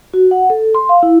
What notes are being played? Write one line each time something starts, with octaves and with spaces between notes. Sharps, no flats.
F#4
F#5
A4
C6
F5
E4